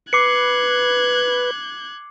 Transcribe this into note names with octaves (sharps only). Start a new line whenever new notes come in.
B4 D6 F#6 G#6 C7 C#7